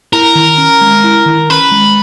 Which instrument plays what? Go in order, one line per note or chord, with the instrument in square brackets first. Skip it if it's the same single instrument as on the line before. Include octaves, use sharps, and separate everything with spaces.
[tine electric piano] E4 [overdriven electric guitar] A#4
[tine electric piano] D#3
C#4
G#3
E4
D#3
[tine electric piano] C#4 [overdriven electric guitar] B4
[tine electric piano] G#3